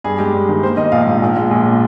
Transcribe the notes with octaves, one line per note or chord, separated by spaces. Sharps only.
G2 G#4
G#3 G4
G2
D#3
A#3 C5
D#3 D#5
A#1 F5
G#2
A#1
G#3
A#1
A#2